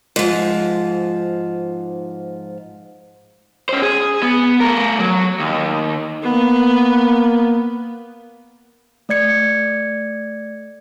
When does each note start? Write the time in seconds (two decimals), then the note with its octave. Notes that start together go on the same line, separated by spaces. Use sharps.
0.16 G#2 F3
3.69 C#4 C5
3.82 G#4
4.22 B3
4.60 A3 A#4
4.99 F#3
5.39 D#2
6.23 A#3 B3
9.09 A3 D5 G#6 C#7